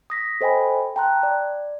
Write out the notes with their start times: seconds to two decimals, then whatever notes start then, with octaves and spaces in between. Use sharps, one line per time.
0.10 D#6 A#6 B6
0.41 A4 C5 D#5 G5 G#5 B5
0.96 G5 A5 A#5 C6 F#6
1.23 D5